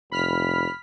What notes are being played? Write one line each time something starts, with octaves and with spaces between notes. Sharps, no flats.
F1 B5 F6 B6